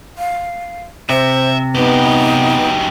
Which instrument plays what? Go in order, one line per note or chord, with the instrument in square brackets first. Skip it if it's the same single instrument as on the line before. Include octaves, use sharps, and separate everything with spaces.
[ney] F5
[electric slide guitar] C3 [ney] C5 [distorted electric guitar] E5
[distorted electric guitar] F#2 G4 [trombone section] B3 [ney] D#4